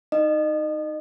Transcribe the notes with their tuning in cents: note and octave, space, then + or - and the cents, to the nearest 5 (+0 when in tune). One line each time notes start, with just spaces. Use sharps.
D#4 +0 D#5 -35